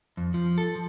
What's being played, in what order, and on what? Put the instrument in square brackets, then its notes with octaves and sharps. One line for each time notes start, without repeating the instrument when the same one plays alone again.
[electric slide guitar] F2
F3
A4
F3